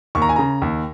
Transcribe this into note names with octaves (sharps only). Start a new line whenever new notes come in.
D#2 C#6
A#5
G#5
C#3 A#5
D#2